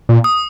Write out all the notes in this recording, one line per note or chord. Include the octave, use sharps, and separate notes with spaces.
A#2
D#6